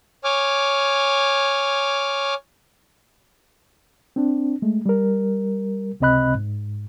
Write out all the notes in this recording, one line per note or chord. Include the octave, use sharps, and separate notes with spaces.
C#5 G#5 D6 F6
C4 D4
G#3 A3
G3 A#4
C#2 C3 C4 D#5 B5 F#6
G#2